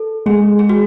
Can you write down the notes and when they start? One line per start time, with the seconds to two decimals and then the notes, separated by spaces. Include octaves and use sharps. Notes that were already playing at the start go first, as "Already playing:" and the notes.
Already playing: A4
0.26 G#3 G#4
0.59 G#4
0.69 F#4